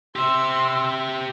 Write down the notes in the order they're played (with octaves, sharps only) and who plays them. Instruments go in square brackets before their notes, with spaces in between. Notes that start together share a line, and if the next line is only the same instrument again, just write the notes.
[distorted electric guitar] G4 E5 [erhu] C6 [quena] E6